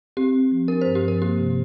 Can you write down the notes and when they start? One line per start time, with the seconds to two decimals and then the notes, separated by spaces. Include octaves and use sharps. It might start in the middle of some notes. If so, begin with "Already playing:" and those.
0.17 C4 G4
0.34 C4
0.52 F3
0.68 D4 A#4
0.81 G2 C5
0.95 G4
1.04 F3 A#4
1.21 A#3 G4
1.38 C3